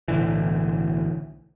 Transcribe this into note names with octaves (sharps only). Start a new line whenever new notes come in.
B1 A2 D3 E3